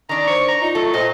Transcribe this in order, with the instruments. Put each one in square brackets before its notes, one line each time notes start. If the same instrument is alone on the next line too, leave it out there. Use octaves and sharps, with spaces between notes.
[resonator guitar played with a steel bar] D#3 D4 [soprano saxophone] A#5
[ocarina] C5 [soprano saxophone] C#6
[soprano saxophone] A#5
[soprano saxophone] D#4 [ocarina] F4
[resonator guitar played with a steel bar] F#3 A3 [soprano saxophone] A4
[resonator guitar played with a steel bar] A#2 A3 [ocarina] C5 [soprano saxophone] D#5